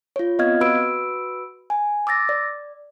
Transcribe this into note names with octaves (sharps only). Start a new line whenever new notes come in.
F4 C#5
B3 C4 D#5 F5 F6 G#6
F#4 B4 B5 E6 D7
G#5
D6 E6 A6 A#6
D5